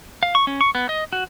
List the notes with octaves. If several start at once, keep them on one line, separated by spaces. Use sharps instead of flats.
F5
C#6
C#4
C#6
B3
D#5
F#4